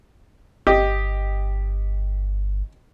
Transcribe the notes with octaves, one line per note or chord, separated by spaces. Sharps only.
G1 G4 D#5